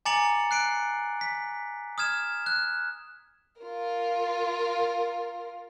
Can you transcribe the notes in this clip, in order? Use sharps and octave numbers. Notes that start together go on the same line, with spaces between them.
G#5 A#5 D6 A6 C#7 F#7
F#6 C7 D7
B6
D#6 F6 G#6 E7
F#6
F4 A#4